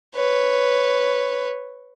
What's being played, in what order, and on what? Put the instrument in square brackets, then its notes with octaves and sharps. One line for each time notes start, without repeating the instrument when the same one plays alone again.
[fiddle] B4 C#5